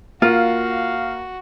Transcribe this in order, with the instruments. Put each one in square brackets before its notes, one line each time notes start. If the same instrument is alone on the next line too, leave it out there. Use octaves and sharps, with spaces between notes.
[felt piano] A#3 [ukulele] F4 [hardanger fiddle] F#4 [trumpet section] F5